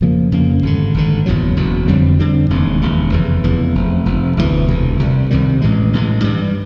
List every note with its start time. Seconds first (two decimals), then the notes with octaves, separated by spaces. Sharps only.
0.01 F2 C#3 F3 A#3
0.32 F2 C#3 F3 A#3
0.63 G#1 G2 D3
0.94 G#1 G2 D3
1.26 F#1 E2 B2 F#3
1.56 F#1 E2 B2 F#3
1.88 F2 D3 G3 C4
2.19 F2 D3 G3 C4
2.50 E1 D#2 C#3
2.81 E1 D#2 C#3
3.12 F1 E2 C#3 E3
3.43 F1 E2 C#3 E3
3.75 F1 F2 C3
4.05 F1 F2 C3
4.37 E1 D2 C3 E3
4.68 E1 D2 C3 E3
4.99 C2 C3 D#3 G3
5.30 C2 C3 D#3 G3
5.62 A1 A2 E3 G#3
5.93 A1 A2 E3 G#3
6.24 G2 E3 G3